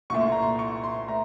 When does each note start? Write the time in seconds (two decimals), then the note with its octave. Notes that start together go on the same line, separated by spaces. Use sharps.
0.10 C2 A#2 A3 C#6
0.21 C6
0.32 A#5
0.42 C6
0.59 C#6
0.84 C6
1.08 A3 A#5